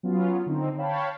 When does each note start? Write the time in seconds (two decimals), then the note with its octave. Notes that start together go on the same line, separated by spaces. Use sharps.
0.03 F#3 B3 C#4 F4
0.46 D3 C4 D#4
0.78 C#5 F5 G5 A5 B5